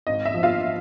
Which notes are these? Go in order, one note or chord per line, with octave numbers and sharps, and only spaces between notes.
G#1 D#5
E5
F3
F4 F5